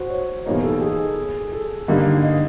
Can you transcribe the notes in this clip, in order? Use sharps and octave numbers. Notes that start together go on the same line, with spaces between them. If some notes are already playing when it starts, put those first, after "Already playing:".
Already playing: F#4 C5
C#5
E2 B2 G3 A#3 D#4 C#5
A4
G#4
A4
G2 D3 G3 A#3 D#4
D#5